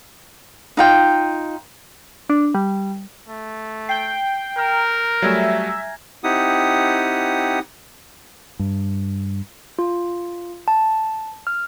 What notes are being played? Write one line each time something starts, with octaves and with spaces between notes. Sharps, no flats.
D#4 F4 G5
D4
G3
A3
G5 C7 G7
A#4 A#5 F6 G6
F#3 G3 A3 E5 G#5 G#6 A#6
C4 D#4 E4 G4 F#5 D#6
G2
F4
A5
F6